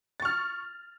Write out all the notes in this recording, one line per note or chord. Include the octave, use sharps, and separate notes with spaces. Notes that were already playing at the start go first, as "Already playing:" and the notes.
C#6 F6 A6